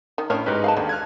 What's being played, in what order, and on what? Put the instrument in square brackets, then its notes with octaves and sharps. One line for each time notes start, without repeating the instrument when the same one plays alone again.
[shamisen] D#3
[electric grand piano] A2 F6 [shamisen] C#4 D4 C#5
[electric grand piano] G#2 D#4 B4 [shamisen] G4
[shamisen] F5 F#5 A5
[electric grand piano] D#2 [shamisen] D3 G3 G#3
[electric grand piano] F6 F#6 G#6